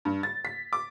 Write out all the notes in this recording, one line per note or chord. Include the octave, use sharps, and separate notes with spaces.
G2
A6
B6
D6